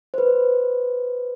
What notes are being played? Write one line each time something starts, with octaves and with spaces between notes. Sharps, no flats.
B4 C5